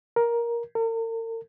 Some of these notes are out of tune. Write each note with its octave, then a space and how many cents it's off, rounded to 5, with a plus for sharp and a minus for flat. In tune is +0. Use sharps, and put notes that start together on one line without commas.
A#4 +10
A#4 -45